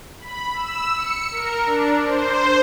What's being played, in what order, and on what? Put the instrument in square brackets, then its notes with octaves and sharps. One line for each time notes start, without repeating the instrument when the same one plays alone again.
[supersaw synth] B5
E6
C#7
A#4
D4
C5